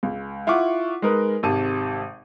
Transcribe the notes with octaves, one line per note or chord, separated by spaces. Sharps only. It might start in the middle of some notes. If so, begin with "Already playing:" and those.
C#2
E4 F4 F#5 C#6 D6
G#3 D#4 A#4 B4
G#1 C3 A5 D#7